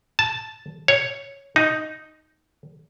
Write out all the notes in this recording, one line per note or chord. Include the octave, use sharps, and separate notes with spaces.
A5
C#5
D#4